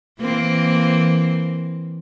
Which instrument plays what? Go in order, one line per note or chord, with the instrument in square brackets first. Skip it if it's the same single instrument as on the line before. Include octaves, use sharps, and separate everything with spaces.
[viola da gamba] E3 A#3 C4